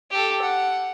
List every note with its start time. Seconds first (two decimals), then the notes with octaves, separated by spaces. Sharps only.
0.11 G4 A4
0.42 F#5